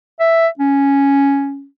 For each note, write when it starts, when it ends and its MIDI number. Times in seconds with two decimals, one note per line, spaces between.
0.20 0.48 76
0.59 1.66 61